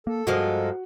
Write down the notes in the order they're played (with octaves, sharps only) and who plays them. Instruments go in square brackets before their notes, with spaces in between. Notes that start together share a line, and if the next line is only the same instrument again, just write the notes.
[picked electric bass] A#3 [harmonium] A4
[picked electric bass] G2 [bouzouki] F3 G#3 A#3 [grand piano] F#4